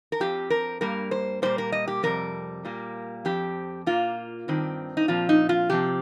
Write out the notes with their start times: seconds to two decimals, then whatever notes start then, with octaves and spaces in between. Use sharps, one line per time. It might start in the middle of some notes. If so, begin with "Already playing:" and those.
0.12 A#4
0.20 F2 F3 C4 G4
0.50 A#4
0.81 G2 G3 A#3 A#4
1.11 C5
1.42 A#2 G3 A#3 C5
1.58 A#4
1.72 D#5
1.87 G4
2.03 F2 C3 G3 A#4
2.65 A#2 G3 A#3
3.25 F2 F3 C4 G4
3.86 A#2 A#3 F4
4.48 G2 D#3 C4
4.97 D#4
5.08 A#2 F3 C4 F4
5.29 D#4
5.49 F4
5.69 C3 F3 C4 G4